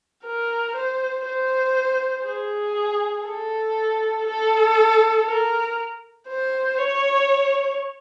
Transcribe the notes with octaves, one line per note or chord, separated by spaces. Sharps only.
A#4
C5
C5
G#4
A4
A4
A#4
C5
C#5